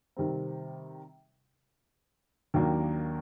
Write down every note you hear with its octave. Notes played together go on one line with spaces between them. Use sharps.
C3 D#3 G3 C4
D#2 D#3 F#3 A#3 D4